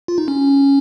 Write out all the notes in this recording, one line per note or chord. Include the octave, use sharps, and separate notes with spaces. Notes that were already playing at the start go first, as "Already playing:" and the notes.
F4
D#4
C#4